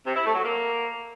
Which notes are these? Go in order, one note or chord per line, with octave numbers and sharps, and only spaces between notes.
C3
E4
A3
F#3
A#3